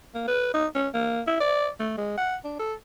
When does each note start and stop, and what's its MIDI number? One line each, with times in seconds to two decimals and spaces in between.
0.15 0.24 58
0.28 0.49 71
0.54 0.67 63
0.75 0.88 61
0.94 1.22 58
1.27 1.38 64
1.40 1.69 74
1.80 1.95 57
1.98 2.15 56
2.18 2.36 78
2.45 2.59 62
2.59 2.74 69